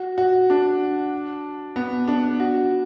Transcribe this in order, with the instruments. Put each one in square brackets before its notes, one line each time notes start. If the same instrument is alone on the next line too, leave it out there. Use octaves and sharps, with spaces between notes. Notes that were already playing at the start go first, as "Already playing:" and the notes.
Already playing: [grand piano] F#4
F#4
D4
B3
D4
F#4